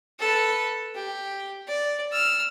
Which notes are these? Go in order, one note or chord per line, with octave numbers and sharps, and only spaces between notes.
A4 B4
G4
D5
E6 F6